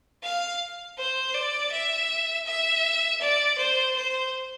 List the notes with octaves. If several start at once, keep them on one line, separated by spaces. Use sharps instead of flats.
F5
C5
D5
E5
E5
D5
C5
C5